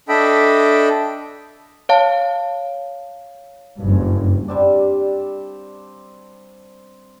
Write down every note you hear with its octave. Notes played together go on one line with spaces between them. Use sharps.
D4 A4 D#5 E5 G5 B5
C#5 F5 A5
F#1 G2
G3 C4 D4